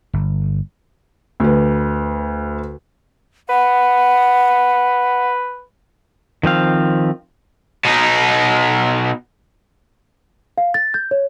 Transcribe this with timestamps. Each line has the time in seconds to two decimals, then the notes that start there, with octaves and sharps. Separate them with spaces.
0.13 G1
1.40 D2 B4
3.49 B4 F#5
6.43 D#3 F3 C4 F5
7.85 B2 D#4
10.58 F5
10.74 A6
10.94 G6
11.11 C#5